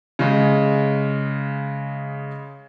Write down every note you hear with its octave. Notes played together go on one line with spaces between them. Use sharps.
C#3 G#3